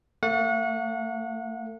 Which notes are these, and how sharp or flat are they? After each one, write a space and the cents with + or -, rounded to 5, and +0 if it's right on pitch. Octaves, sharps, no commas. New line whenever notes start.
A3 +40 F#5 -30